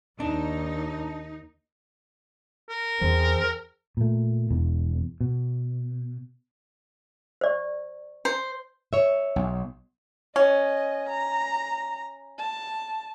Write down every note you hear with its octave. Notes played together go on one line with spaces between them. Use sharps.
D#2 D4 D#4
A#4
E2 C4 G#4 C5
A#2 A3
E1 E2
B2
C5 D5 C#6
C5
C#5 E5
B1
C#4 D#5
A#5
A5